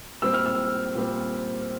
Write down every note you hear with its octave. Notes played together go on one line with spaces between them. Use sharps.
A#2 G3 C4 E6
F6
E6
A#2 G3 C4